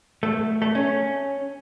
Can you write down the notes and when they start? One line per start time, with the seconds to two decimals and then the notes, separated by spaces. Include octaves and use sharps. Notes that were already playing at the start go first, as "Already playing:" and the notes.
0.23 A3
0.62 A3
0.75 C#4